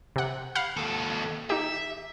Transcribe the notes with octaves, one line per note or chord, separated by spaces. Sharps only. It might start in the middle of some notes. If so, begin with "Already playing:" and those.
C3 F#5
F5 F#5 B5
D#2 A4
D#4 G4 E5